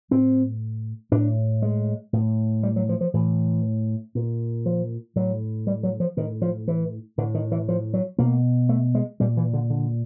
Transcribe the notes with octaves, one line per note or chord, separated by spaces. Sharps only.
A2 C4
A2 D4
G#3
A2
G3
F#3
F3
F3
A2 E3
A#2
F3
A2 F#3
G3
F#3
F3
A2 D#3
F3
E3
A2 D3
D#3
E3
F3
F#3
B2 A#3
A3
G#3
A#2 G3
E3
D3
D3